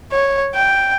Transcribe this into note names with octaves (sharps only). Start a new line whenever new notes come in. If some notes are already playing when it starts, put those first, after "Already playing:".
C#5
G5